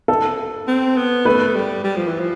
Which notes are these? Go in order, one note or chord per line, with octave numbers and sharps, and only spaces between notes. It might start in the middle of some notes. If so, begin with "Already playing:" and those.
A4
C4
B3
A3 B4
G3
G3
F3
E3
F3